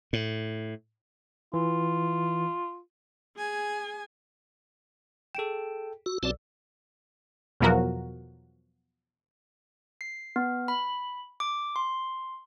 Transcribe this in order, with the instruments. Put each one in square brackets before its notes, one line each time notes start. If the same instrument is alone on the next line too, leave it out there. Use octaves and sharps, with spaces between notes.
[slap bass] A2
[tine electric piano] E3 [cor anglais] F4
[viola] G#4 G#5
[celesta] G#4 D7 E7 [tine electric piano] A4 G5
[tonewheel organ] F#4 [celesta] E6
[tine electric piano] B1 D5 [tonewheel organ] C4 F#4 A5
[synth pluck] E2 B2 F3 F#3 F#4 A#4
[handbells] C7
B3
B5
D6
C6